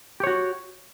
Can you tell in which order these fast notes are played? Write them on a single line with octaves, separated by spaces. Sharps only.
G4 C#5 F#4